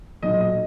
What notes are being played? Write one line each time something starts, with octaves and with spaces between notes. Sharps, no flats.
B1 A#2 F#3 D#5
D#5